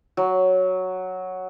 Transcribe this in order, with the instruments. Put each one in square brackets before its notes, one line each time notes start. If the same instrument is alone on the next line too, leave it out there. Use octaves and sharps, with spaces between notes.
[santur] F#3